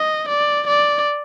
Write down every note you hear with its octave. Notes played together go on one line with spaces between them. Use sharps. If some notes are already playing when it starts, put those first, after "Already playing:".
Already playing: D#5
D5
D5